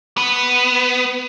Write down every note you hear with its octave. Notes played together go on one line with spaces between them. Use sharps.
B3